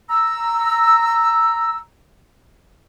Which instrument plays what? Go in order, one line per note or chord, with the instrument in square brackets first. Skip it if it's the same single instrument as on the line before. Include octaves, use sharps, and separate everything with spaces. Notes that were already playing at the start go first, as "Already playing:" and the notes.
[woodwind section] A#5 E6